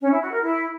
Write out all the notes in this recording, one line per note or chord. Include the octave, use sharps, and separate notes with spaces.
C#4
E4
F#4
A#4
E4